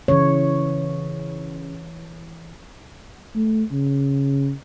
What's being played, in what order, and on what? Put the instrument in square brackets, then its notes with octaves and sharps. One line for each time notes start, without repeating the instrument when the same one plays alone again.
[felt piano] C#3 [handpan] E3 C#5
[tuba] A3
C#3